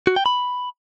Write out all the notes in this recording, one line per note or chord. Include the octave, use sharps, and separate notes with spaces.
F#4
G5
B5